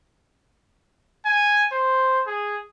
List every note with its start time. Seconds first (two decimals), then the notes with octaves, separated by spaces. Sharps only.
1.25 G#5
1.73 C5
2.27 G#4